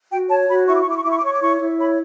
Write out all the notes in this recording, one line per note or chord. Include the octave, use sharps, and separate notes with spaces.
F#4 G5
C#5 A5
F#4 B5
E4 C#6
D6
C#6
E4 D6
C#6
E4 D6
C#6
D6
C#5 C#6
D6
E4 C#6
E4
C#5 B5